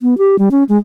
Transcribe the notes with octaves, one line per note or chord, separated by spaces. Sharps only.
B3
G4
G3
C#4
G#3